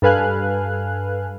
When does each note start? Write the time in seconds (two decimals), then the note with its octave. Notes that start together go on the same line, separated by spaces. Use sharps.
0.02 G2 A4 B4 F5 G#5 F#6